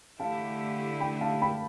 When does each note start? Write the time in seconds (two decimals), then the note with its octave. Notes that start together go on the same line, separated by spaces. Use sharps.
0.19 D3 A3 E4 G4 F5 A5
1.00 G5 B5
1.21 F5 A5
1.41 G5 B5